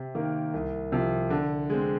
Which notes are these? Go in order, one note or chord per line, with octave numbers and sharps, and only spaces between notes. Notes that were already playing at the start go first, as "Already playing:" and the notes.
Already playing: C3
D#3 A#3
C2
C3 F3
D3
G#3 C4